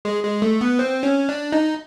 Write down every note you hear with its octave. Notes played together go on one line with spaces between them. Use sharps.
G#3
G#3
A3
B3
C4
C#4
D4
D#4